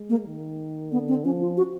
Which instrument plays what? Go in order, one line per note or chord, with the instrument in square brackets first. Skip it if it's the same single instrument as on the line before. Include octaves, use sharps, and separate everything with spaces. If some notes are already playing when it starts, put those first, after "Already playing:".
Already playing: [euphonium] G#3
[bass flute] A#3
[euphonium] D#3
[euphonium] D3 [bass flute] B3
[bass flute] C4
[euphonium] F3 [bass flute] C#4
[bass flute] F4
F#4